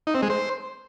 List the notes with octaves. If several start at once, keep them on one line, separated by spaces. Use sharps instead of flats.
D#4
C4
G#3
C5